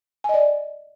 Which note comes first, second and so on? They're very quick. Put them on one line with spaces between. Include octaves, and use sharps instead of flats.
G#5 D#5 D5